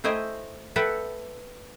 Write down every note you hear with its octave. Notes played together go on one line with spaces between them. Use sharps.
A3 E4 C5 D#5 G5 G#5
A4 B4 E5 F#5 G5